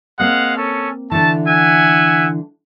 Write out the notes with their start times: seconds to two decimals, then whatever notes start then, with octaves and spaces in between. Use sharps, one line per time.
0.20 G#3 A#3 C4 F5 F#5
0.58 C#4 A4
1.12 D3 E3 A3 A5
1.48 E5 F#5 G#5